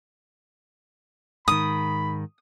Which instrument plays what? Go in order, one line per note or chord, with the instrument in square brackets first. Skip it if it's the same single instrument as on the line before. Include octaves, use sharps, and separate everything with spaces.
[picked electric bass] G#2 D#3 [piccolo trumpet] B5 [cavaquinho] D#6